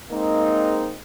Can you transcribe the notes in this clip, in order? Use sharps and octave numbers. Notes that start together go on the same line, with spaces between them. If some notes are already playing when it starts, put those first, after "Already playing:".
G#3 A#3 C4 D#4